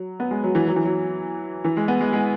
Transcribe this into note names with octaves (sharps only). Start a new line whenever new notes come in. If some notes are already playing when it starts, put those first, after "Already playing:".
Already playing: F#3
B3
G#3
F#3
E3
F#3
E3
F#3
E3
G#3
B3
G#3
G#3